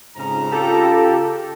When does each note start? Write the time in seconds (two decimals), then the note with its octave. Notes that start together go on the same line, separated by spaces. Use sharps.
0.16 F2 G#2 C#3 A#5
0.52 F4 G4 A4